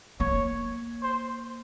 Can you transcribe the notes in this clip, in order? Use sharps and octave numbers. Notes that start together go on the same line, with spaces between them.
A#3 C#5
C5